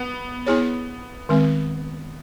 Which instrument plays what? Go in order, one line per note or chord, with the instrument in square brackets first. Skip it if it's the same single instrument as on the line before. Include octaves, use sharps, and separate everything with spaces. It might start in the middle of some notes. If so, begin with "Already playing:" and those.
Already playing: [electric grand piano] B3
[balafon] B3 E4 G#4 C#5
D#3 G#3 C4